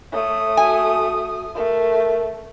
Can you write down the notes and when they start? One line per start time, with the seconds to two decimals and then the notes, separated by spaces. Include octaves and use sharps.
0.12 A3 C#5 D#6
0.57 F#4 G#5
1.55 A3 A#4